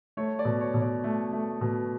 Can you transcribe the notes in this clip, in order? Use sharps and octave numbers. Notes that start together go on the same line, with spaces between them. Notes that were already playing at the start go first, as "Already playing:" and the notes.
A3 C#5
D5
B2
C#5
B2
D5
A3
A3
B2